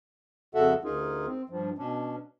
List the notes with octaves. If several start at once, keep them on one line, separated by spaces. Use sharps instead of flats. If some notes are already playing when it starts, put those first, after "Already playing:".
F2 C#3 F#4 A4 E5 F#5
D2 C#4 D#4 F4 G#4 A#4
C4
G2 F3
B2 C#4 D4